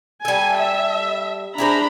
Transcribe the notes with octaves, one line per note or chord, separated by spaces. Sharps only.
G3 A4 G#5
E5
D4 E4 G#4 C5 A#5 B5